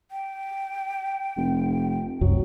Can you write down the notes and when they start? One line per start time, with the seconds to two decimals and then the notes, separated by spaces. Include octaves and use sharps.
0.11 G5
1.37 F1
2.21 F1 C2 F#2 F#3